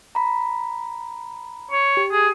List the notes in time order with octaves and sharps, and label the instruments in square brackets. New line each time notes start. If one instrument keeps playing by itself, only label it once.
[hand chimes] A#5 B5
[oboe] C#5
[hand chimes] G4
[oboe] G#4